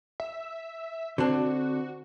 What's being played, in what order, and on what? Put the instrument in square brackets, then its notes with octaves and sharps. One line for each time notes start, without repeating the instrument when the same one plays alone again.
[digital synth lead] E5
[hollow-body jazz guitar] D3 C4 D4 [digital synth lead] F#4